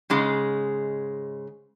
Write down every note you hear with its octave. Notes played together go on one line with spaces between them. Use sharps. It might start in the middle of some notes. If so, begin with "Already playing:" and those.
G#2 C#3 G#3